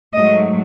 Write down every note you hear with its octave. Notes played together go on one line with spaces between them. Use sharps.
G#2 F#3 A3 D#5